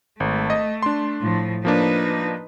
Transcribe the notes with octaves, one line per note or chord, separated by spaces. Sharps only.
G#1 A3
D#5
D4 C6
A2 F3
F3 A#3 D4 D#4 B4